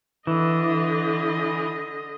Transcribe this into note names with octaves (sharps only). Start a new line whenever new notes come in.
D3 E3 D#5